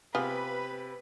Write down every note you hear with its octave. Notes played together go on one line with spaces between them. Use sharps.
C3 B3 F4 G#4 B4